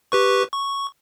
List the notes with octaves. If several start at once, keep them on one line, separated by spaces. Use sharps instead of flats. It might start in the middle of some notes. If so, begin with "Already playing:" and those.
G4 B4 C#6
C#6